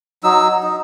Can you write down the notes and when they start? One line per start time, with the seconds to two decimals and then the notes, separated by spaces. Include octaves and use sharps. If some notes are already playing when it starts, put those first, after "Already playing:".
0.24 F#3 D#4 E6
0.63 D#4